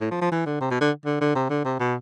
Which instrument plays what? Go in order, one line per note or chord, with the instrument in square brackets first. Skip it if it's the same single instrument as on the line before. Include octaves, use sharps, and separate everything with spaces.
[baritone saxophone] A2
F3
F3
E3
D3
C3
B2
D3
D3
D3
C3
D3
C3
B2